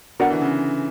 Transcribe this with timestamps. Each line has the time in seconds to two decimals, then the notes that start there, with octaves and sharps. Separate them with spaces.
0.20 D3 B3 F#4 A#4 D5 F#5
0.30 E3
0.41 C#3